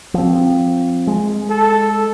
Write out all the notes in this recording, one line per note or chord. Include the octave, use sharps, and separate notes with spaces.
F3 C4
G#3
A4